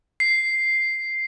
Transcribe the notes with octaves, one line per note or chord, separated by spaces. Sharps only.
C7